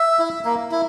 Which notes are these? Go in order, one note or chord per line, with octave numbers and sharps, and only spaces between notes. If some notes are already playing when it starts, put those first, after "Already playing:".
Already playing: E5
E4
A#3
E4